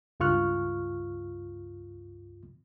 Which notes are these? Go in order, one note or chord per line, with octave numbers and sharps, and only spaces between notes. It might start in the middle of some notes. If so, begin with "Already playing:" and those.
C#2 G2 F4 C#6 F6 F#6